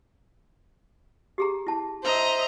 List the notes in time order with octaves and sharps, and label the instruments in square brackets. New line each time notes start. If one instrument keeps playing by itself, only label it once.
[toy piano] G4 G#4 A#5
E4 A5
[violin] C5 E5 [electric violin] D#5 A#5